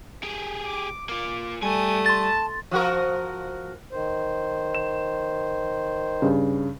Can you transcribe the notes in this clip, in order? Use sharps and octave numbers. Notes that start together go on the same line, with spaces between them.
G4 G#4
D6
A#3 F4 D6
C2 G3 A3 G#5 D#6
A5 C6 A6
F3 F#4 A#4
D#3 C5
E7
G2 C#3